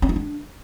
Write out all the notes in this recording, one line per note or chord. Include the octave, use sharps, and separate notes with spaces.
C#4
D#4
D4